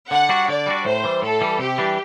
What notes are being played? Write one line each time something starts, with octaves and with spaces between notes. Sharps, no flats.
D3 F#5
G3 D4 F#4
D3 D5
G3 D4 F#4
A2 C5
E3 G3
A2 A4
E3 G3
C3 G4
E3 G3 D4